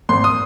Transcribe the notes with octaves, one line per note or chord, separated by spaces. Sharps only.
G#1 C6
D#6